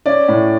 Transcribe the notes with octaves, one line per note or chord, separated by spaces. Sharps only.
C#4 D5
A2